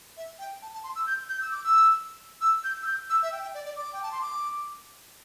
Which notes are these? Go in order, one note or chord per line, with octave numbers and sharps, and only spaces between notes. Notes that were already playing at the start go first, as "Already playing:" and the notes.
E5
G5
A5
A5
C6
E6
G6
G6
E6
D6
E6
E6
G6
E6
G6
E6
E5
G5
G5
D5
D5
D6
G5
A5
C6
D6